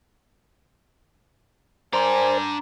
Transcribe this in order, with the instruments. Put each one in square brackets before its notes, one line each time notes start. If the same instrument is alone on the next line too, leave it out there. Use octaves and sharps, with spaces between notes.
[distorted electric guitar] D4 G5 [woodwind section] A#4 D5 G#5 [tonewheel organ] C5 [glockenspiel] A#5 C6